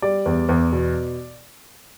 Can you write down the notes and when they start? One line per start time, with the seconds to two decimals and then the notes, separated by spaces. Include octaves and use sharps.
0.02 G3 D5
0.26 E2
0.49 E2
0.72 B2